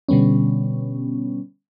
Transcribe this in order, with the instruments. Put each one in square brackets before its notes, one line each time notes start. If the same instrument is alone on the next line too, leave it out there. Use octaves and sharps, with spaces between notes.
[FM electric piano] B2 D3 G3 B3 C#4